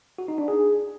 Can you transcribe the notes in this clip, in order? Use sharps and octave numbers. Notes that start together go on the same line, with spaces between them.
F#4
D#4
D4
G#4